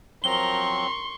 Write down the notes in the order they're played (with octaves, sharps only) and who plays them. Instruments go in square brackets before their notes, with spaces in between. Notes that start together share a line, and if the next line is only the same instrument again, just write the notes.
[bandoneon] F3 F#3 C4 [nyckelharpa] A#4 A#5 [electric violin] C6 C#6 [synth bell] G7